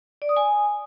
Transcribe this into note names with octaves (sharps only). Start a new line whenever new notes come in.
D5
D#6
G#5